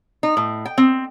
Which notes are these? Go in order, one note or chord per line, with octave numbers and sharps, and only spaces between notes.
D#4
A2
G5
C4